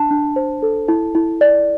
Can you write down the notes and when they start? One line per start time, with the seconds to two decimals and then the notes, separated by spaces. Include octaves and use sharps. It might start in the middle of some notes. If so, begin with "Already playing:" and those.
Already playing: D4 A5
0.10 D4
0.36 C5
0.62 A4
0.88 E4
1.15 E4
1.41 D5